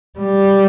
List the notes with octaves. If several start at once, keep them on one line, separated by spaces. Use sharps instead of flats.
G3